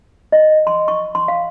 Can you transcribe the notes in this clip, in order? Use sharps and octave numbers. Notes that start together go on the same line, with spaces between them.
D#5
C6
C#6
C6
F5